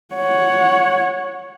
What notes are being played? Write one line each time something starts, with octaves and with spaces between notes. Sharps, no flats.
C#5 F#5